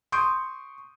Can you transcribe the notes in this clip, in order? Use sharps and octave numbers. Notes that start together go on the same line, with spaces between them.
C6 C#6 D#6 G6 D7